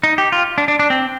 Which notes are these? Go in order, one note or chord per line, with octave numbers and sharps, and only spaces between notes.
D#4
G4
F4
D4
D4
D4
C4